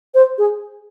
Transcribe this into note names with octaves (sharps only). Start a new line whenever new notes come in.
C5
G#4